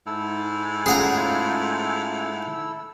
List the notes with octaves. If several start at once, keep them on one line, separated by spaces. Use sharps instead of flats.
G#2 E4 A4 E6
A3 C#4 F4 G#4 F#5 A#5